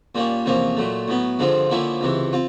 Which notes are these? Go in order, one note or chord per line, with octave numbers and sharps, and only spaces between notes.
A#2 G3 A#3 C#4
E2 C3 F3 A#3 C#4
A#2 F#3 A3
A2 F#3 B3
G2 D3 F3 G#3 C4
D3 F3 A#3 C#4 E4
C#2 C3 E3
C4 F4